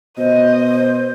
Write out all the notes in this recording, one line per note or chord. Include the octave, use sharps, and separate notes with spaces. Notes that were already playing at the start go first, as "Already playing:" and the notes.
B2 C5 D#5